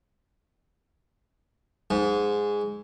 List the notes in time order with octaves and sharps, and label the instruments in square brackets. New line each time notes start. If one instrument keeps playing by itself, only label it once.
[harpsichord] G#2